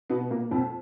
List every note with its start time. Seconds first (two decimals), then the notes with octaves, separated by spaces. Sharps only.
0.10 B2 B3
0.31 A#2 A#3
0.51 F2 F3